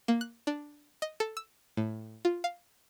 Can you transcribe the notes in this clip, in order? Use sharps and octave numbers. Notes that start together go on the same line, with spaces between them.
A#3
F#6
D4
D#5
A4
E6
A2
F4
F5